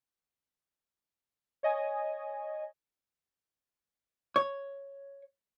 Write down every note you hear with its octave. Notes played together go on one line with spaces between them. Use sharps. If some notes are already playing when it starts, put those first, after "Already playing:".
C#5 D#5 G#5
C#5